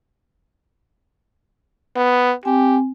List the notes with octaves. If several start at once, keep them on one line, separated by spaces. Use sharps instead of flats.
B3
C4 G4 G#5